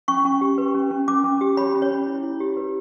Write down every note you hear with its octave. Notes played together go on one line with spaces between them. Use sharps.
C#4 C#6
C#4
G4
B4
C#4
C#4
C#4 D6
C#4
G4
C#5 B5
C#4
C#5
C#4
E4
E4
G4
B4